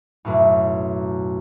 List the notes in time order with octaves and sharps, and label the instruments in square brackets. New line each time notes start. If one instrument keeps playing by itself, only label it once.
[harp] B1 F#2 A2